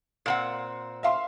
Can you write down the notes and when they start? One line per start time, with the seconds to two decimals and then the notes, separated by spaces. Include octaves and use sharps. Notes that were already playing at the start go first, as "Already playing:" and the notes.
0.26 A#2 C4 F#5
1.03 E5 F5 C6